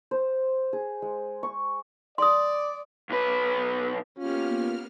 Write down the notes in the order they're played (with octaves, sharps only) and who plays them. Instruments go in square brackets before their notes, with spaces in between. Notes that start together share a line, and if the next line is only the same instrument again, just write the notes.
[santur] C5
G#4
G#3
C#6
[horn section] D5 [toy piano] C6 D#6
[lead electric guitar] B1 B4
[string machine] A#3 B3 F6 [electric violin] C#4 G4 [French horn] F4